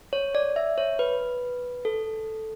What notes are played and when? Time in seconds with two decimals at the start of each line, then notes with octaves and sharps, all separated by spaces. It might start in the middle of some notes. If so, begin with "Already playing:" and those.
0.13 C#5
0.35 D5
0.56 E5
0.78 C#5
0.99 B4
1.85 A4